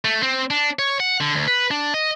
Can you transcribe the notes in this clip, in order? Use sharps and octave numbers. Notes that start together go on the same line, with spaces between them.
A3
C4
D4
C#5
F#5
D3
D2
B4
D4
D#5